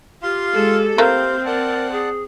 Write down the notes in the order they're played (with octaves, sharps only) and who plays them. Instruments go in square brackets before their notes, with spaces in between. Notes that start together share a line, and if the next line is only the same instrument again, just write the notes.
[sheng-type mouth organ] F4 F5 C6 [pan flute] G4
[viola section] G#3 A4
[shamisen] E3 A3 A#3 [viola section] C4 [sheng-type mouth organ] C5 F5
[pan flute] A#4 [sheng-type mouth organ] D5 F#5 A5
[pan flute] G#4